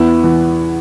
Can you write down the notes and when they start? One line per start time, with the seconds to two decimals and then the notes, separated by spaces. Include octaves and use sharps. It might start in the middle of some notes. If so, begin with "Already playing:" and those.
Already playing: E2 B3 E4
0.24 E3